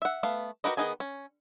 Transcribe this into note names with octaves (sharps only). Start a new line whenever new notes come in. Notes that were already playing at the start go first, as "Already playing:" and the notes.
E5 F#5
A3 B3 F5
F#4 G4 A#4 B4 D#5
D#3 B3 D#4 G#4 G#5
C#4